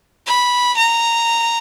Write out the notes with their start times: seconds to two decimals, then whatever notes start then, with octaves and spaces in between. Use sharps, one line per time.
0.27 B5
0.77 A#5